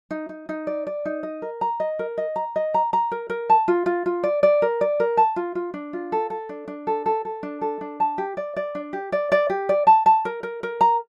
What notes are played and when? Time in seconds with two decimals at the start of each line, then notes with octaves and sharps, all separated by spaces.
0.11 D#4
0.29 D#4
0.49 D#4
0.67 D5
0.87 D5
1.05 D#4
1.23 D#5
1.42 A#4
1.61 A#5
1.80 D#5
1.99 A#4
2.18 D#5
2.36 A#5
2.56 D#5
2.74 A#5
2.93 A#5
3.11 A#4
3.30 A#4
3.50 A5
3.68 F4
3.86 F4
4.06 F4
4.23 D5
4.43 D5
4.62 A#4
4.81 D5
5.00 A#4
5.17 A5
5.36 F4
5.55 F4
5.74 D4
5.93 F4
6.12 A4
6.30 A4
6.49 D4
6.68 D4
6.87 A4
7.06 A4
7.25 A4
7.43 D4
7.61 A4
7.81 D4
8.00 A5
8.18 G4
8.37 D5
8.56 D5
8.75 D4
8.93 G4
9.12 D5
9.32 D5
9.50 G4
9.69 D5
9.87 A5
10.06 A5
10.25 A#4
10.43 A#4
10.63 A#4
10.81 A#5